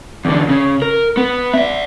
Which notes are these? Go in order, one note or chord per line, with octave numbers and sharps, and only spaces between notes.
E2 D3
C#3
A#4
B3
D5 E5